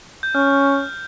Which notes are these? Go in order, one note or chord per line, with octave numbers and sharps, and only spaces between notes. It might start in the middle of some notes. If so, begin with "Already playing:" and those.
G6
C#4 F6